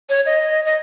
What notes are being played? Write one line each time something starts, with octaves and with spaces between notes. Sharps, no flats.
C#5
D#5
D#5